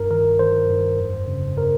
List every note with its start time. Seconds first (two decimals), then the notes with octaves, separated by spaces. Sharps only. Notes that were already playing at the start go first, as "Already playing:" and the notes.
Already playing: G2 A#4
0.11 D#3 A#4
0.39 D#3 C5
0.70 G2
0.99 F2
1.28 C#3
1.57 C#3 A#4